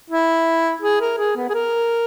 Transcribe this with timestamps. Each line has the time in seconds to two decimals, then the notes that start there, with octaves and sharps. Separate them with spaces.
0.10 E4
0.82 G#4
1.01 A#4
1.18 G#4
1.36 B3
1.49 G#4
1.54 A#4